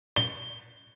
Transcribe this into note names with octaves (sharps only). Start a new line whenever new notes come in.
G7